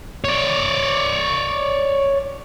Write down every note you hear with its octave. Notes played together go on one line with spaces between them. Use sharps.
C#5 D5